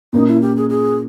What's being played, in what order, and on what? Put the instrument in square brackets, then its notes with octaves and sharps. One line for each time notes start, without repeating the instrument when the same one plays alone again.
[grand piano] A#2 A#3 C#4 [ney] D#4
[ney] E4
G4
G#4
G#4